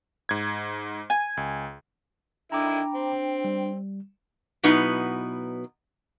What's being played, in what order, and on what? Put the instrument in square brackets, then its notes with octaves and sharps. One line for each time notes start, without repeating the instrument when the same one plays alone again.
[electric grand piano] G#2 G#6
[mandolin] G#5
[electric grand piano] C#2
[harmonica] D3 D#3 E4 [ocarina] D4 [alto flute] G5 [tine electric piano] A#5 B5 D6
[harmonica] C4
[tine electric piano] G3
[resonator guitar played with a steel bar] B2 F#3 B3 D#4 E4